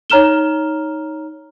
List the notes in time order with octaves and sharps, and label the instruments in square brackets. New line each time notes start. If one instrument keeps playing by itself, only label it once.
[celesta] D#4 C#5 A#5 F6 E7 G7